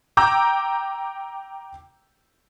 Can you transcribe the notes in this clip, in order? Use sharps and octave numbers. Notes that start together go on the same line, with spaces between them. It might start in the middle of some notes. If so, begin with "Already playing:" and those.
G5 A#5 D6 E6 G6